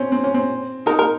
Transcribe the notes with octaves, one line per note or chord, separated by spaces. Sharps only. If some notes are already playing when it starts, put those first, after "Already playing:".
Already playing: C4 C#4
C4
C#4
C4
D#4 A#4
A#4